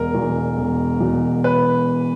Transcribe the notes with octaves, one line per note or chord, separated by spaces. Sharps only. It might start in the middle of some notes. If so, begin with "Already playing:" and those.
Already playing: E1 A#4
E2 B2
E1
E2 B2
B4